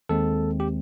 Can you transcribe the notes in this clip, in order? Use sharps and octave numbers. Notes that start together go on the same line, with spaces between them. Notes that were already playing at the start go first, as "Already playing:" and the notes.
D#2 D#3 G#3 C4 A4
G4